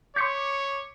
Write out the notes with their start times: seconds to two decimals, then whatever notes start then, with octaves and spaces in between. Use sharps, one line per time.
0.16 C#5 C6 D6 G6 B6 C#7